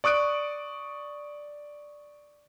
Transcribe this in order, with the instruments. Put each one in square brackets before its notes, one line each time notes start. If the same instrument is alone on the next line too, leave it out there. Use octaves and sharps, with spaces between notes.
[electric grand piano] D5 C#6 D#6 F#6 D7